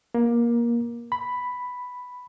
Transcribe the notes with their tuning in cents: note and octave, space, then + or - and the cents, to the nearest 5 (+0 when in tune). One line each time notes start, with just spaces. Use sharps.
A#3 +20
B5 +5